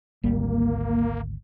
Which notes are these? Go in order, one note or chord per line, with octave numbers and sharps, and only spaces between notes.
G#1 D2 G3 A#3